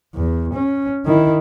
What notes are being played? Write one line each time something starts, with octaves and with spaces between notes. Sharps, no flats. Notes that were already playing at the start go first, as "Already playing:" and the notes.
E2
C#4
D#3 E4